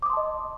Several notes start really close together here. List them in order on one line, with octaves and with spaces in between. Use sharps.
D6 D#6 C6 A5 D#5